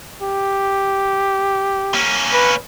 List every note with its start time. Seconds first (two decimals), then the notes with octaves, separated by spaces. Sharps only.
0.22 G4
1.94 A#3 C#4
2.33 B4